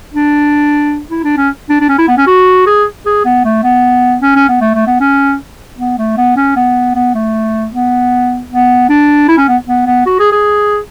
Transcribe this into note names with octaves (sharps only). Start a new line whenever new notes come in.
D4
E4
D4
C#4
D4
D4
C#4
E4
B3
C#4
F#4
G#4
G#4
B3
A3
B3
C#4
C#4
B3
A3
A3
B3
C#4
B3
A3
B3
C#4
B3
B3
A3
B3
B3
D4
E4
C#4
B3
B3
B3
F#4
G#4
G#4